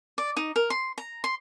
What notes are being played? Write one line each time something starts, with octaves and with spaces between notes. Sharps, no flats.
D5
D#4
A#4
C6
A#5
C6